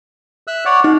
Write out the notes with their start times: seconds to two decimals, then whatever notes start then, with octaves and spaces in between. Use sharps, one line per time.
0.47 E5 E6 F#6
0.65 C#5 D5 F#5
0.84 D#4 F#5